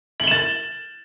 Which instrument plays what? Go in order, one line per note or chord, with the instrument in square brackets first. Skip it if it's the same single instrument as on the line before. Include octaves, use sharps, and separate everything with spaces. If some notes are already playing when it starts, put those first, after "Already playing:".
[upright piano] F#7
G7
E7
A6